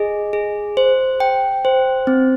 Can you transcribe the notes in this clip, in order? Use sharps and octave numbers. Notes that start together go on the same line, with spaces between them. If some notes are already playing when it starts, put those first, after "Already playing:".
Already playing: G#4 D#5
G#4
C5
G5
C5
C4